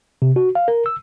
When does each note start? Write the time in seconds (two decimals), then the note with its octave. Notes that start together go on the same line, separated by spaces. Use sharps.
0.22 C3
0.36 F#4
0.55 F5
0.68 A#4
0.86 E6